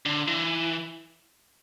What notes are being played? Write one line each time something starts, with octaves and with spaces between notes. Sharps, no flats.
D3
E3